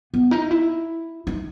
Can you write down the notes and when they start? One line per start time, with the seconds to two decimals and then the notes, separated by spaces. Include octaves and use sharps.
0.14 B3
0.31 D#4
0.51 E4
1.27 D#4